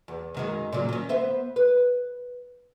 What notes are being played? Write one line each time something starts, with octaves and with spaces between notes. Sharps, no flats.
E2
F#2 D#3 G#3
A#2 C#3 F#3
D#3 C#4
B3 C5 E5
B4